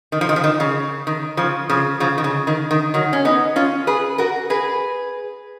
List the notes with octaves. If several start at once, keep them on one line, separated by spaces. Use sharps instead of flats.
D#3
F3
D#3
F3
D#3
C#3
D#3
C#3 F3
C#3 F3
C#3 F3
D#3
C#3
D#3
D#3
D#3 F#3
C#4
B3 D#4
C#4 F4
G#4 B4
F#4 A#4
G#4 B4